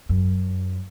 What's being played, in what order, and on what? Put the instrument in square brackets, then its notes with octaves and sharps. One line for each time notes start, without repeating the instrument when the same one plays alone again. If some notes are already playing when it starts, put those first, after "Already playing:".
[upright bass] F#2